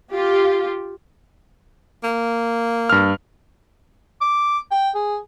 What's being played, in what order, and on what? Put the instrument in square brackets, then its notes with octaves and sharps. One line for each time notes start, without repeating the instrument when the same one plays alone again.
[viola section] F4 G4
[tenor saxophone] A#3
[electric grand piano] G2 F6
[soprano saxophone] D6
G5
G#4